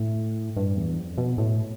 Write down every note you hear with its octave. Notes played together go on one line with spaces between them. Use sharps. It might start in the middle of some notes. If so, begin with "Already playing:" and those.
Already playing: A2
G2
E2
F2
B2
A2